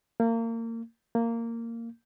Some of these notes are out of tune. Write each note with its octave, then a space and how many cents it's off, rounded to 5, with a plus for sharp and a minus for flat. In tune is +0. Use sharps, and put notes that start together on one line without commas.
A#3 -30
A#3 -15